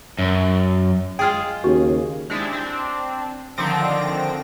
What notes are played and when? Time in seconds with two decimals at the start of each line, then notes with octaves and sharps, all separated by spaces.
0.19 F#2
1.19 G#3 F4 G#4 G5 F6
1.64 D#2 C#3 F#4
2.30 G#3 C4 D4 E4
2.53 C4 D4
3.57 D3 D#3 F3 C4 A#6 D7